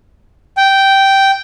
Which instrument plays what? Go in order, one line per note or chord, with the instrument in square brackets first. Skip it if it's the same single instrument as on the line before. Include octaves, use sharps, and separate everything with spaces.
[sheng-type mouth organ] G5